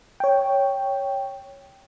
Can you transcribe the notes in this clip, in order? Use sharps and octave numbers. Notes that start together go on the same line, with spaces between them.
C#5 G5